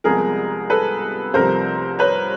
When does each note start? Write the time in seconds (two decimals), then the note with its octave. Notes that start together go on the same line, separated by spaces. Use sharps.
0.04 C2 C3 F3 G#3 B3 G#4 A#4
0.70 A4 B4
1.34 C2 C3 F3 A3 A#4 C5
1.99 B4 C#5